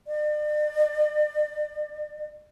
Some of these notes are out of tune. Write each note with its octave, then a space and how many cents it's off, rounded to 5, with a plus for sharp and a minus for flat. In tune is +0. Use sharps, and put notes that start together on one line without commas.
D5 +40